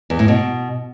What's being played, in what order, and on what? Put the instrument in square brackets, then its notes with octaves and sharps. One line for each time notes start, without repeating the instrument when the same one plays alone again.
[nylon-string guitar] E2
A2
B2